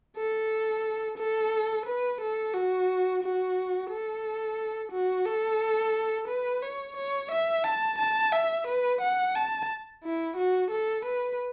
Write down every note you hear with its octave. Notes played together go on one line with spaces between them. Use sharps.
A4
A4
B4
A4
F#4
F#4
A4
F#4
A4
B4
C#5
C#5
E5
A5
A5
E5
B4
F#5
A5
E4
F#4
A4
B4